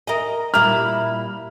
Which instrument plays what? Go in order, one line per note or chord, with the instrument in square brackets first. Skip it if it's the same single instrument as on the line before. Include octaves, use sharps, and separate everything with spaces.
[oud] A#4 D#5 [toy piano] E5 G#5
[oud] A#2 G3 E4 [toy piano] A#4 A#5 [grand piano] F6